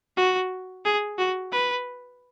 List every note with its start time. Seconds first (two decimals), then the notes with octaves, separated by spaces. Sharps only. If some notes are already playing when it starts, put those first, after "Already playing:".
0.17 F#4
0.85 G#4
1.18 F#4
1.52 B4